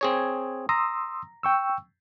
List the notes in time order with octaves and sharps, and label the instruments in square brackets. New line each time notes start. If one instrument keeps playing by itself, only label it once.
[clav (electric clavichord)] C4 G#4 C#5
[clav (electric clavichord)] A#5 [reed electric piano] C6 D#6 E6
[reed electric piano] G5 C#6 E6